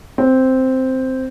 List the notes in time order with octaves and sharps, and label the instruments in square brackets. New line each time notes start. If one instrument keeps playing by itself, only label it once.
[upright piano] C4